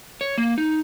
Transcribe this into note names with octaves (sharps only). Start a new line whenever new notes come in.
C#5
A#3
D#4